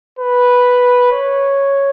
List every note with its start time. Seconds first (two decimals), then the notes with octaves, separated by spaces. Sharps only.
0.19 B4
1.12 C#5